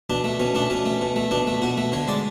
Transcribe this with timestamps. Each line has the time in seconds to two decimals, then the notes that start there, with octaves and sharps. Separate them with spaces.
0.10 B2 D4
0.24 A3
0.40 B2 C#4
0.55 A3 D4
0.70 B2 C#4
0.86 A3
1.01 B2
1.16 A3
1.31 B2 D4
1.47 A3
1.62 B2 F#4
1.78 A3
1.92 D3 C#5
2.08 G#3 D5